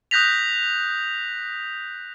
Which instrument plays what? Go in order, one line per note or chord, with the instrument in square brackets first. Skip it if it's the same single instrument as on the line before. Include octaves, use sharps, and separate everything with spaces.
[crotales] D#6 F#6 G6 A#6 B6 F7